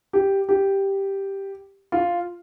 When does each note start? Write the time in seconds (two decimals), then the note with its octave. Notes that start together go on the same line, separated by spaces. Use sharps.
0.13 G4
0.49 G4
1.92 F4